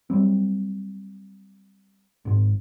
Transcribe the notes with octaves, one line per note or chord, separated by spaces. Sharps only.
F#3 G3 C4
G#1 G#2